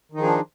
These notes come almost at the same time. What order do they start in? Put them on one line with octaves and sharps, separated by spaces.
D#3 D#4 F3 G#4 D4